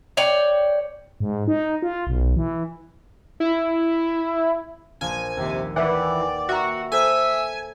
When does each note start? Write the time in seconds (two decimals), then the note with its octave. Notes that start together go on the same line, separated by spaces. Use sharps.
0.17 C#5 D5 G5
1.20 G#2
1.48 D#4
1.82 F4
2.07 B1
2.36 E3
3.40 E4
5.01 A#1 F3 G#5 E7
5.37 D#2 C3
5.76 E3 B4 D5 F#5 G5
6.49 F#4 E5 A#5
6.92 A4 C5 E5 G#5 A#5